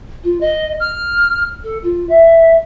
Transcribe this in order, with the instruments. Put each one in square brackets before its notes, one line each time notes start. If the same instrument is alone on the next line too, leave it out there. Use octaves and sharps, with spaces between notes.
[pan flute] F4
D#5
F6
A4
F4
E5